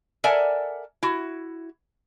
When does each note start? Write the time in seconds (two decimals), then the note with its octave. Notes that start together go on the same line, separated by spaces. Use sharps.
0.24 A4 A#4 D5 E5 F#5 G#5
1.03 E4 F#4